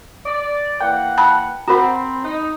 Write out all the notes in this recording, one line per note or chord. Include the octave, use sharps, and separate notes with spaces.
D5
E3 A#3 F#5 G5
A5 B5
C4 F#4 A#4 F#5 A#5 B5
D#4